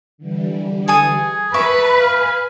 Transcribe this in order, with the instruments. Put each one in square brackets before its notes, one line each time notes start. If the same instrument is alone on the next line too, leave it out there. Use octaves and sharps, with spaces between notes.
[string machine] D3 E3 G3
[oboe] G#4 [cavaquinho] A4 G#5 D#6
[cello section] B4 [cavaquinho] E5 C#6 D6 [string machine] A5 A#5
[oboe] F5 [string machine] G#5